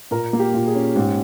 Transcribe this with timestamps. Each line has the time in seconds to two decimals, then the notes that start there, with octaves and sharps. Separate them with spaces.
0.11 A#2 A#4
0.33 A#3
0.39 G4
0.54 A#2
0.68 G#4
0.75 C#4
0.95 G#2 G4